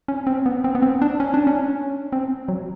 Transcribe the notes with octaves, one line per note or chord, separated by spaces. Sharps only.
C#4
C4
B3
C4
B3
C4
D4
C#4
D4
C#4
C4
F#3